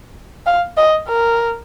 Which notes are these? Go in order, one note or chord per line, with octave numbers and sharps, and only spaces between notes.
F5
D#5
A#4